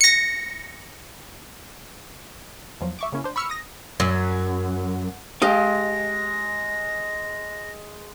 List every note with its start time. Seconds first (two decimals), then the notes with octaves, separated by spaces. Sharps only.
0.01 A#6 C#7
2.81 E2 F3 F#3
2.99 E5 C#6 D6
3.12 C#3 A#3 C#4 E4
3.24 D4 C5
3.36 B5 C#6 E6 F6 C#7
3.50 D#6 A#6
4.00 F#2
5.42 G#3 G4 D#5 F5 A#6